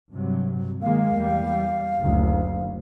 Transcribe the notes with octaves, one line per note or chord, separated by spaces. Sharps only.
G2 C3 F#3
D#3 G#3 A#3 F5
E2 G3
F#1 D2